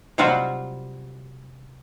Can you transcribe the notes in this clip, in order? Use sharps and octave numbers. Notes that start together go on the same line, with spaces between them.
C3 F#3 G3 F4 F#4